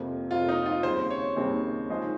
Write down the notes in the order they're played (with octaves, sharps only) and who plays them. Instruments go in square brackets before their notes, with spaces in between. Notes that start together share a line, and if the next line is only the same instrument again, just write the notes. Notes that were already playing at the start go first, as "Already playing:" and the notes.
Already playing: [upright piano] F2 C3 F3 A#3
[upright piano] F2 C3 F3 A#3 [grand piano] F4
[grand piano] D#4
F4
[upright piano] D#2 C#3 G3 C4 D#4 [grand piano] C5
[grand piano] C#5
[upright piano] D#2 C#3 G3 C4 D#4
F3 G#3 D#4 G#4 C5